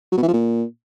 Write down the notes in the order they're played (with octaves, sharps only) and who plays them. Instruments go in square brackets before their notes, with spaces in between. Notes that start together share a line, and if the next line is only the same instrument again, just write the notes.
[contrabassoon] F#3
B2
E3
F3
A#2